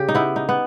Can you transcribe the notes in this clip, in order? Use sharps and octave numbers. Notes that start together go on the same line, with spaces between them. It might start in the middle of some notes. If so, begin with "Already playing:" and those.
Already playing: C#3 G4
D#4
B3 E4
D#4
B3